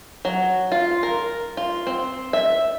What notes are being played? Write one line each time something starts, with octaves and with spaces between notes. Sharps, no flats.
F#3
F4
A#4
F4
C4
E5